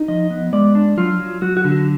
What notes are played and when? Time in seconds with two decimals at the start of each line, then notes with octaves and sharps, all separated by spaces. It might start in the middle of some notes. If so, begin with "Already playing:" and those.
Already playing: D#4
0.08 F3 D#5
0.31 B3
0.53 G#3 D5
0.75 D4
0.97 F#3 F4
1.19 F#3
1.42 F#3 F#4
1.57 F#4
1.64 D3
1.72 F#4